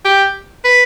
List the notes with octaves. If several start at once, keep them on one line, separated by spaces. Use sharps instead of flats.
G4
B4